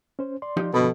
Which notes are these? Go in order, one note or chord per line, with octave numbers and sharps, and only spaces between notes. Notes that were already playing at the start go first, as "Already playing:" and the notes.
C#4 C5
D5 C6
F3 D#4 G4
G2 B2 D3 F3 A4 B5